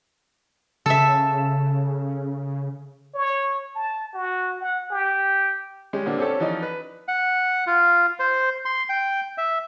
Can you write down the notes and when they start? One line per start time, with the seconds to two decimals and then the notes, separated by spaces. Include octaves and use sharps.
0.86 C#3 A4 E5
3.14 C#5
3.75 A5
4.14 F#4
4.61 F#5
4.91 G4
5.93 G3 G#3 C#4 G4
6.06 A#2 D3 G3 A#3 C4 D4
6.19 C4 C#4 G4 A4 C#5
6.40 E3 F3 C#4 D#4 D5
6.63 B4
7.08 F#5
7.67 F4
8.19 C5
8.65 C6
8.89 G5
9.38 E5